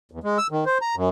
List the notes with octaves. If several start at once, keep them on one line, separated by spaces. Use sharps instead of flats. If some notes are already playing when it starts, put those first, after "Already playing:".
E2
G#3
E6
D#3
C5
A#5
F#2